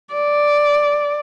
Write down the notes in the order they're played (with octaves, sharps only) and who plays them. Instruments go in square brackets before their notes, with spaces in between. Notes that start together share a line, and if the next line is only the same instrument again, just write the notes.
[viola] D5